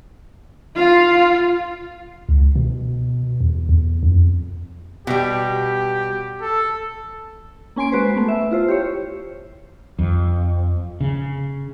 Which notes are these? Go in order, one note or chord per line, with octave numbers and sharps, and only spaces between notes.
F4 F5
C#2
B2
E2
E2
F2
B2 G3 G4
A4
A#3 C#4 G#5 C6 D7
G#3 F#4 B4 C5
A3 B3
E5
E4 F4 C5
G4 C5 C#5
F2
C#3